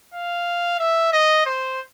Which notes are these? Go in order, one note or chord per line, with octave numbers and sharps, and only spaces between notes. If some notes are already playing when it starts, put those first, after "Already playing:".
F5
E5
D#5
C5